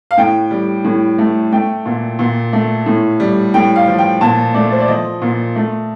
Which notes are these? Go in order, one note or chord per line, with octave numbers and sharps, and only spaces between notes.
F5
A2 G5
G3
A2
A3
A3 G5
A#2
A#2
A3
A2
G3
A2 G5
F5
F3
G5
A#2 A5
A3 D5
C5
D5
F3 D#5
A#2
A3